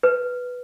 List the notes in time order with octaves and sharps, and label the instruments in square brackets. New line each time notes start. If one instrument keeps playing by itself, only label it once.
[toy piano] B4